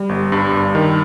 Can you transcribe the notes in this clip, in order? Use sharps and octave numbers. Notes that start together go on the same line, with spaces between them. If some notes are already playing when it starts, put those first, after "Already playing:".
Already playing: G3
G1
G2
G2
D#3